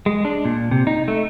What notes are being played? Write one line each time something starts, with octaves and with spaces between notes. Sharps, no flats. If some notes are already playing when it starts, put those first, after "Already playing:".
G#3
D4
A#2
C3
D#4
A3